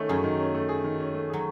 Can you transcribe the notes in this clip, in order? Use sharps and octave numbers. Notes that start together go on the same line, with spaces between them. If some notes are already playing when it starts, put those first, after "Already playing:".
Already playing: D#3 A3 C#4
F#2 F#3 G#4
D#3
C#4
A3
G#4
D#3
C#4
A3
F#3 G#4